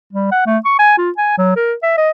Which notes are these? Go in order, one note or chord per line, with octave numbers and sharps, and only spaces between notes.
G3
F#5
A3
C#6
G#5
F4
G#5
F#3
A#4
E5
D#5